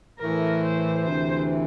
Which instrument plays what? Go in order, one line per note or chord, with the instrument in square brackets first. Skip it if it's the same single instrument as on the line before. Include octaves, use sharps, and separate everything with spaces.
[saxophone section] A2 E3 A3 [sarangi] A#4
[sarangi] C5
[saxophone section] D2 C3 E3 [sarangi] C5